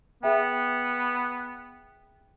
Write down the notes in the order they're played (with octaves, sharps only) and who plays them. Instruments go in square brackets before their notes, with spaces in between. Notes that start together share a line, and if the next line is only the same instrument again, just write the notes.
[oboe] B3 [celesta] G#4 E5 G5